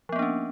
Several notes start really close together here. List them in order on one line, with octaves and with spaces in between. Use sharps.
F3 B3 A#3 D4 C#4